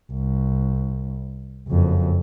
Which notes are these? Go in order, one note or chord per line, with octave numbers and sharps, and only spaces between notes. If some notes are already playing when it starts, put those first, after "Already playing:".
C2
F#1 F2